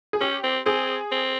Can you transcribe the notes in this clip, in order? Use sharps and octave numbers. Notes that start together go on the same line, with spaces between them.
G#4
C#4 G4
C4
C4 G#4
C4